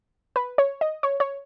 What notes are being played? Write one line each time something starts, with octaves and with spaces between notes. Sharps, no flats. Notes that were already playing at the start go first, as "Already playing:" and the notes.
B4
C#5
D#5
C#5
C#5